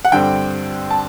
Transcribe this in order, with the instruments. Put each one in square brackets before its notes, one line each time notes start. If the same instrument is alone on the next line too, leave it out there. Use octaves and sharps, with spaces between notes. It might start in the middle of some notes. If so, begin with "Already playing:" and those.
[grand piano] F#5
G2 D3 G3 C4 G5
A5